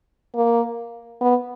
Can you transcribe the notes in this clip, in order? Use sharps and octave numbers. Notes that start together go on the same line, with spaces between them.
A#3
B3